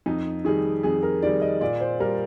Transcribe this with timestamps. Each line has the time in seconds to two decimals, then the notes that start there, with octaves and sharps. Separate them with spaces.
0.06 F2 D#4
0.45 D#3 G3 G#4
0.83 F2 G#4
1.03 A#4
1.22 D#3 G3 D5
1.41 D#5
1.61 A#2 D5
1.81 C5
2.00 G3 A#4